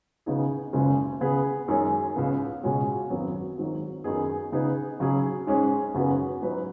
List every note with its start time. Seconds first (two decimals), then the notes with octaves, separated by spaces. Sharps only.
0.26 C#3 B3 D#4 G#4
0.73 F#1 F#2 C#3 G#3 B3
1.21 C#3 B3 G#4 B4
1.68 F#2 D#3 G#3 C#4 G#4
2.16 C#2 C#3 B3
2.63 C#2 B2 G#3 C#4 F#4
3.10 G#1 F#2 F#3 B3
3.58 G#1 G#2 D#3 F#3 D#4
4.04 F#2 D#3 B3 D#4 G#4
4.52 C#3 B3 D#4 G#4 B4
5.00 C#3 F#3 C#4 G#4
5.47 G#2 G#3 C#4 G#4
5.94 F#2 C#3 B3 F#4 B4
6.41 G#2 F#3 D#4 B4